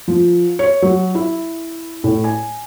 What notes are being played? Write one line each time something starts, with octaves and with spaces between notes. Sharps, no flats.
F3
C#5
F#3
E4
A2
G#5